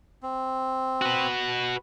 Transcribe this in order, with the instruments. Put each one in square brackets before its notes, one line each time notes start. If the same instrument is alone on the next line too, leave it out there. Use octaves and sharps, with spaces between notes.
[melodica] C4
[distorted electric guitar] F#4 B4